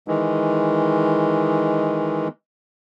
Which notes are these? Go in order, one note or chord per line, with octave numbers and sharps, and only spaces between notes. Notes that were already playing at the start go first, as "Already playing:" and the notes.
D#3 E3 G#3